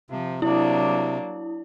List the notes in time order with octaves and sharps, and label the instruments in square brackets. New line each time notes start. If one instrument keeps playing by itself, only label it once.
[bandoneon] C3 [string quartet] F3
[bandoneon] C3 [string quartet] F#3 A#3 D4 [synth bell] E4